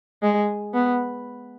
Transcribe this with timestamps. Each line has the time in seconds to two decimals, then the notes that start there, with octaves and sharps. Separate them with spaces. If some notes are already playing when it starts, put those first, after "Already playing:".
0.23 G#3
0.74 B3